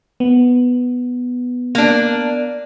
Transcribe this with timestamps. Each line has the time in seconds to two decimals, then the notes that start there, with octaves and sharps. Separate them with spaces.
0.20 B3
1.75 A#3 D4